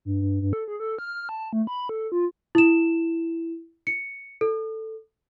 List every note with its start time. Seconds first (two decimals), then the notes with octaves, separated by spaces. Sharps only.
0.05 G2
0.21 G2
0.42 G2
0.53 A4
0.68 G#4
0.80 A4
0.99 F6
1.29 A5
1.53 A3
1.67 B5
1.89 A4
2.12 F4
2.55 E4 E7
3.87 C#7
4.41 A4